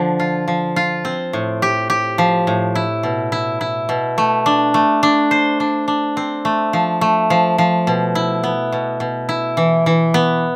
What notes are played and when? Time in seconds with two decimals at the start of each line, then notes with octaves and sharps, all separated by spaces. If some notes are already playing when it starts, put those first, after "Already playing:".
Already playing: D3 F3
0.20 F4
0.48 F3
0.76 F4
1.05 C4
1.33 A2
1.62 G4
1.90 G4
2.18 F3
2.47 A2
2.75 E4
3.03 B2
3.32 E4
3.61 E4
3.89 B2
4.18 A3
4.46 D4
4.74 A3
5.03 D4
5.31 C5
5.60 D4
5.88 D4
6.17 C4
6.45 A3
6.73 F3
7.01 A3
7.30 F3
7.58 F3
7.87 B2
8.15 E4
8.44 B3
8.72 B2
9.00 B2
9.29 E4
9.57 E3
9.86 E3
10.14 B3